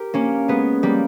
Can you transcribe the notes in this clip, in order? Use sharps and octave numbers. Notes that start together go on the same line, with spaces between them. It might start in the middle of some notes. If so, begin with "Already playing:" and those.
Already playing: G4 A#4
A#3 C#4
G#3 B3
G3 A#3